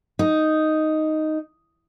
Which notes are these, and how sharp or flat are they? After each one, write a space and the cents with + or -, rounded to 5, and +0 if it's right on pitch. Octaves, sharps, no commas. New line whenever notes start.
D#4 +0